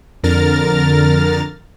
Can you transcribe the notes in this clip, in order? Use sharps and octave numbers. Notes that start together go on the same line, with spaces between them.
F2 D3 A#4 A#5 F6 A6